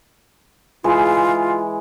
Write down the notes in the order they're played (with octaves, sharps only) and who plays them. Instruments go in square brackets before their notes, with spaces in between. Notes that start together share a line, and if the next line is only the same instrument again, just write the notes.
[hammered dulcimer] E3 G#3 [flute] F4